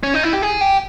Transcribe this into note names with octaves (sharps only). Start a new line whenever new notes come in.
C#4
D#4
E4
G4
G#4
G4